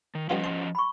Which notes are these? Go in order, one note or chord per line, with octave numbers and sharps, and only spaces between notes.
D#3
F3 G3 B3 C#4 F4 D#5
A5 C6
B5 C#6